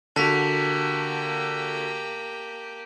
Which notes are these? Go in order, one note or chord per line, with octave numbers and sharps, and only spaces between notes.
D3 A#3 F#4 G4 A5 B6 F7